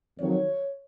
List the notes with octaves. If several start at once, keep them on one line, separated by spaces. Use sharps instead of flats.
F2 D#3 F#3 C#5